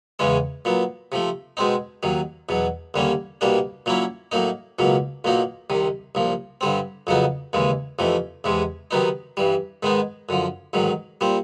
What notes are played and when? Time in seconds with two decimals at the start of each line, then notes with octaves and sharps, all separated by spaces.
0.19 E2 C#3 E3 G#3 C#4
0.65 A#2 F#3 B3
1.12 C3 F3 A3
1.57 B2 G#3 C4 D#4
2.03 D#2 D#3 F#3
2.49 E2 B2 F#3
2.94 D#2 D3 G3 A#3 C#4
3.41 C2 B2 G3 A#3 D4
3.86 A#2 F#3 A#3 C#4 E4
4.32 A2 F#3 A#3 D#4
4.79 C#2 B2 F#3 A#3
5.24 B1 A#2 F#3 A#3 D#4
5.70 C2 C3 D#3
6.15 C2 A#2 F3
6.61 G2 D3 G3 C4
7.07 F2 C#3 F#3 B3 D#4
7.53 D#2 C#3 E3 G#3
7.99 F2 C3 E3 A3
8.44 E2 C3 E3 G#3
8.91 C3 D#3 F#3 B3 D#4
9.37 G2 E3 G3
9.83 G#2 D#3 G#3 B3 D#4
10.29 F#2 D3 F3
10.73 A1 G#2 D#3 F#3
11.21 A#2 G3 C4